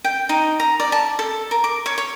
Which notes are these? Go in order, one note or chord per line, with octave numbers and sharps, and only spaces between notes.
G5
D#4
A#5
D5
A5
A4
A#4
D6
C#5
C#5